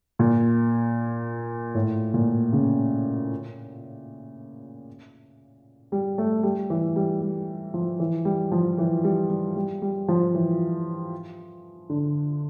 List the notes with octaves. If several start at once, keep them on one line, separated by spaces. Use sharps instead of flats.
A#2
A2
A#2
C#3
G3
A3
G3
E3
G3
G3
F3
E3
G3
F3
E3
G3
G3
G3
G3
F3
E3
D3